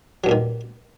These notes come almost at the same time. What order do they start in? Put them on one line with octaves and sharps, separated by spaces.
F#3 G2 A#2 D#3